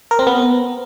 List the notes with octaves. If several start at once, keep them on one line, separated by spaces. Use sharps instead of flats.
A#4
C4
B3